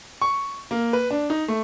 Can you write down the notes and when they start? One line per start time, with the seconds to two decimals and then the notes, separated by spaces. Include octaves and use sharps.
0.22 C#6
0.71 A#3
0.93 B4
1.11 D4
1.30 D#4
1.48 A3